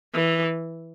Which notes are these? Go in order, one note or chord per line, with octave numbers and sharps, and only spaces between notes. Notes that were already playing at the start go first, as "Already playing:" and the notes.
E3